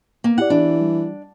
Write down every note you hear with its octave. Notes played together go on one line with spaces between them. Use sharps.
A#3
E4 G4 D5 F#5
E3 D4
G3